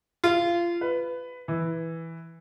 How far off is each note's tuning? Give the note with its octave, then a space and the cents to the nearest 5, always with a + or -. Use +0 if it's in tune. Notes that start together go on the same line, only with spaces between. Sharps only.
F4 -25
B4 +15
E3 -5